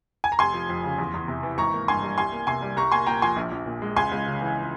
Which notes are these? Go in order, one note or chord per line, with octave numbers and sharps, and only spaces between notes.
G#5
A#5
F1 G#5 C6
F3
F2
C#3
E2
E2
C3
E3
G#1 A#5 C#6
A#3
G2 G#5 C6
G3
C2 G#5 C6
A#3
C3 G#5 C6
G3
C2 A#5 C#6
A#3 G#5 C6
A#2 G5 A#5
F3 G#5 C6
A#1
A#1
A#2
G#3
C#2 G#5 C6
C#2
C#3
E3